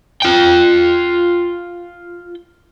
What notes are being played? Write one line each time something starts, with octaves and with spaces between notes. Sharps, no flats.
F4 G5